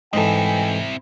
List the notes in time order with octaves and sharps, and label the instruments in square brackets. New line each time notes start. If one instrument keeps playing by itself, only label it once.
[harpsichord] G#2 E3 [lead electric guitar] C4 E4 [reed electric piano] A4 D#5 [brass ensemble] G5 G#5